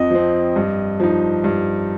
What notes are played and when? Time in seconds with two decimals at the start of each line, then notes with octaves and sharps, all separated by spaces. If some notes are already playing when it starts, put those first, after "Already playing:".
Already playing: F2 F3 C4 D#5
0.11 F3 C4
0.56 G2
1.00 F3 D#4
1.44 G2